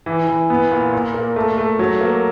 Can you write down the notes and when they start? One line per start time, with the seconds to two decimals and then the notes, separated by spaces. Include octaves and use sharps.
0.06 E3
0.28 E3
0.50 B3
0.72 A#2
0.93 A#2
1.14 A#3
1.36 A3
1.58 A3
1.79 F#3
2.01 A#3